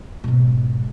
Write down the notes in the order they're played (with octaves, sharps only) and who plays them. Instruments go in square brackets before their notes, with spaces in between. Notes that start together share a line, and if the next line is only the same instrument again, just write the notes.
[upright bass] G#2 B2